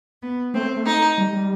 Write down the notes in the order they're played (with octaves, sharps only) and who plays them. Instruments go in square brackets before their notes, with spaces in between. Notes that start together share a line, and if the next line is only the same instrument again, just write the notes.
[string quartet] B3
[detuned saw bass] A3 [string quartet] C4
[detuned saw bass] A3
[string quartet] D#4
[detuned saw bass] G3
G3